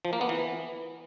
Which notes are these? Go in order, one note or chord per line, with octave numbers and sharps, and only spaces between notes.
F3
A#3
B3
E3